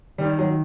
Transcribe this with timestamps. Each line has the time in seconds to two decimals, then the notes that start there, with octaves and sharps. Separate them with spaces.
0.18 D#3 G3
0.39 F#3